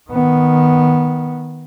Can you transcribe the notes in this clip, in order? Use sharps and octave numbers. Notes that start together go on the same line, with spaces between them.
D#3 B3